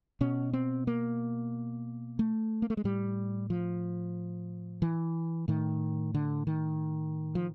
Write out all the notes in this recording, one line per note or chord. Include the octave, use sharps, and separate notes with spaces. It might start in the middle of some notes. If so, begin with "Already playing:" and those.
B2 C#4
C4
A#3
A3
A#3
A3
G#3
A2 G3
F3
E3
A2 D#3
D3
D#3
F3